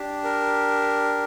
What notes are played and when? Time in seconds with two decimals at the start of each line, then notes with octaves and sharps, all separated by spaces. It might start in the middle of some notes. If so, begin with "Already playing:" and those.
Already playing: D4 G4
0.24 A#4